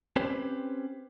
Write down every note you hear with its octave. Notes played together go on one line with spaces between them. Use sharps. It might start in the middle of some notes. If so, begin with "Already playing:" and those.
C4 C#4 G4 B4 C5